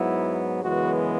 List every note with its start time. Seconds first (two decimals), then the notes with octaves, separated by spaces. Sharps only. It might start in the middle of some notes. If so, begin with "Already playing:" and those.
Already playing: G#2 F#3 B3 E4
0.63 F#2 C#3 E3 G#3 B3 F#4